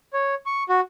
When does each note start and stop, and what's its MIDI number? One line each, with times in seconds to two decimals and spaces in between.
0.13 0.35 73
0.46 0.63 85
0.69 0.80 66